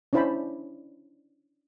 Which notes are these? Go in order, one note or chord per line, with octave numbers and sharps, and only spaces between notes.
C#4 D4 E4 C5 A5 B5